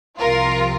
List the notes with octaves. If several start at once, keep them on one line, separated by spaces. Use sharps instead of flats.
C2 C3 F3 F4 A#4